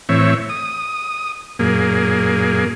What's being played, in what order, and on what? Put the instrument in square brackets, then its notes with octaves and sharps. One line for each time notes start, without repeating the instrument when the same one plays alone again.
[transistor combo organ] A2 E3 C4 C#5 E5
D#6
F#2 A#2 A#3 G#4